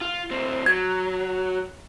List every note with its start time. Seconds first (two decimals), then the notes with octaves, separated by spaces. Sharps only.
0.01 F4
0.31 D2 C4
0.66 F#3 G#6